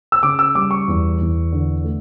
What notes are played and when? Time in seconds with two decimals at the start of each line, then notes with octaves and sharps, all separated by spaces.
0.12 E6
0.23 C#3 D6
0.39 E6
0.55 G3 D6
0.71 C#6
0.88 E2
1.20 E2
1.52 D3
1.84 A3